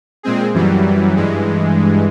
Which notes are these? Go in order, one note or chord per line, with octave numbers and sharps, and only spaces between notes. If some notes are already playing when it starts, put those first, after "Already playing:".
A#2 G#3 C4 G#4
F#2 E3 F#3 G3
G2 E3 G#3